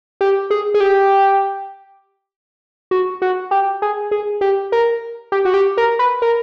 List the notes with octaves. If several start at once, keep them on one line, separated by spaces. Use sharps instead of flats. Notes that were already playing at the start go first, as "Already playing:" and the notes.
G4
G#4
G#4
G4
F#4
F#4
G4
G#4
G#4
G4
A#4
G4
F#4
G4
A#4
B4
A#4